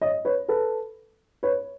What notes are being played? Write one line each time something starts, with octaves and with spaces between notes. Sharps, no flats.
C#5 D#5
B4 C#5
A4 B4
B4 C#5